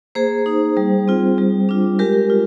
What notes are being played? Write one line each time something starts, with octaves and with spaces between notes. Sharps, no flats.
A#3 G#4 C5
D#4
G3
C4 F4
G3
D4 F4
G#3 G4 A#4
F4